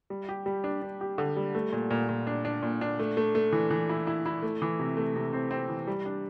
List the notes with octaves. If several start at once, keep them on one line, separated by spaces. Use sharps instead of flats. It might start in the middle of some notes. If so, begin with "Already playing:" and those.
G3
G4
G3
D4
D4
G4
D3
G3
A3
A#2
A#2
A#2
D4
D4
A#2
D4
A3
A3
A3
E3
E3
E4
E4
E4
A3
E3
C3
A3
C3
C4
C4
E3
G3
D4